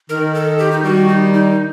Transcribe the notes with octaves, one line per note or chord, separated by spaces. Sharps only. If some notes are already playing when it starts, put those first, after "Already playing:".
D#3 A#4
A4
G4
D#4
D#3 G3 F#4
D#4
D#4